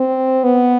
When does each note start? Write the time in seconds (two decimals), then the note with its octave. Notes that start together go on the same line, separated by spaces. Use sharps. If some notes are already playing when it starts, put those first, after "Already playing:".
Already playing: C4
0.44 B3